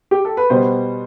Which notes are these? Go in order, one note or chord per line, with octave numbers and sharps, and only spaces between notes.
G4
A4
B4
B2 G3 B3 C5